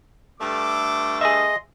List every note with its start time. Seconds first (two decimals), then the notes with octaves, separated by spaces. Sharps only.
0.40 G2 A3 D6
1.21 G#4 D#5 E5 C6